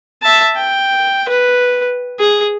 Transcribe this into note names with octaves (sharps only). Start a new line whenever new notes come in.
E5 A5
G5
B4
G#4